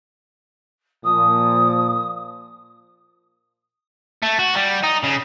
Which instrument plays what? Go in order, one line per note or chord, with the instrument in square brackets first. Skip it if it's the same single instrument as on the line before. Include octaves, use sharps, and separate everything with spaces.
[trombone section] A#2 F3 [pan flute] D#6
[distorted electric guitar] A3
F#4
G3
D#4
C#3